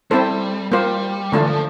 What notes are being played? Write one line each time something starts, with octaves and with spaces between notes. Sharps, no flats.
G3 C4 E4 A4 C5
G3 A#3 F4 C5
D3 F3 A3 D4 F4
E3
F3